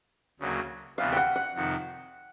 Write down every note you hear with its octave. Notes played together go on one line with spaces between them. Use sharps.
D2 C#3 F#3 A#3
D2 C3 E3 G3 B3 F5
F#5 G5
F#5
F2 C3 D#3